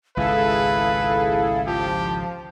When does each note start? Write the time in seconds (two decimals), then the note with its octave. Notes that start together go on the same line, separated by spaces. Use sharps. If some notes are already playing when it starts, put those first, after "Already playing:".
0.17 G#1 C#2 E4 G#4 A4 B4 F5
1.66 F3 G4 A5